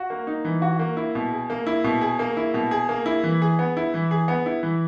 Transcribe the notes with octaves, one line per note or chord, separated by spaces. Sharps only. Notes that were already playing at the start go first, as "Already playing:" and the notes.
Already playing: F#4
A#3
D#4
E3
F#4
A#3
E4
B2
G#4
A#3
E4
B2
G#4
A#3
E4
B2
G#4
A#3
E4
E3
G#4
B3
E4
E3
G#4
B3
E4
E3